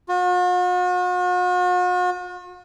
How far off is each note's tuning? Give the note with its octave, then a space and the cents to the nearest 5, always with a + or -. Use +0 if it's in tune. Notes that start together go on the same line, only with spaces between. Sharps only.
F#4 -45